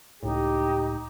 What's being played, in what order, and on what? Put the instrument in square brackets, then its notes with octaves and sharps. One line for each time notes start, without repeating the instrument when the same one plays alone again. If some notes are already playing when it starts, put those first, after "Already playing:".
[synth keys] C#2 A2 [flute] D#4 [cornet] G4